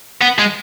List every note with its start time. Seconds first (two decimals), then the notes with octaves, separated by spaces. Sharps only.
0.21 B3
0.39 G#3